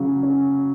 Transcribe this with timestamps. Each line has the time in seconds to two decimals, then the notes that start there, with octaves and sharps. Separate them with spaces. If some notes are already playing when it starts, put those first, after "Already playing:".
Already playing: C#3 F#3
0.23 C#4